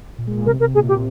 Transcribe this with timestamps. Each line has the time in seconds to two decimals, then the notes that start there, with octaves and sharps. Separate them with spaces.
0.18 A#2
0.27 G#3
0.37 A#2
0.46 C3 A#4
0.60 C3 A#4
0.75 A#2 G#4
0.88 G4